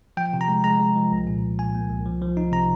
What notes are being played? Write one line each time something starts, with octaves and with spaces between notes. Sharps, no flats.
F3 G5
C3
A#5
G#3
G#3 A#5
G#3
F3
C2
A#2
A#2
A#2 G#5
A#3
C2
F3
F3
D#4
C3 A#5